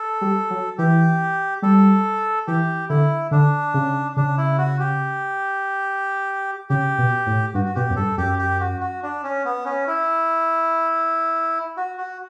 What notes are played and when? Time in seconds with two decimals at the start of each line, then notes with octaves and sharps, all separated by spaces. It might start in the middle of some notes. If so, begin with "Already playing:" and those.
Already playing: A4
0.21 G3
0.50 F#3
0.78 E3 G4
1.62 G3 A4
2.47 E3 G4
2.89 D3 E4
3.31 D3 D4
3.74 C#3
4.16 C#3 D4
4.38 E4
4.58 F#4
4.80 G4
6.69 C#3 G4
6.98 B2
7.27 A2
7.54 G2 F#4
7.66 F#4
7.75 B2 G4
7.90 F#2
7.96 G2 A4
8.17 F#2 G4
8.39 G4
8.60 F#4
8.81 F#4
9.03 D4
9.23 C#4
9.45 B3
9.65 C#4
9.87 E4
11.77 F#4
11.98 F#4